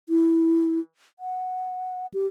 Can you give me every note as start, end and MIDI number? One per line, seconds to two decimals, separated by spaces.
0.09 0.79 64
1.19 2.06 78
2.14 2.27 67